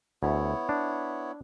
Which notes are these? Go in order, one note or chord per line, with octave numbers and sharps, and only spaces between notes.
D2 B3 E4 C#5
D4